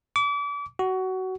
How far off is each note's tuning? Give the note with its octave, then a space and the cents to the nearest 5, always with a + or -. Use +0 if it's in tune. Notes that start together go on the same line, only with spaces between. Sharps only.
D6 -35
F#4 +20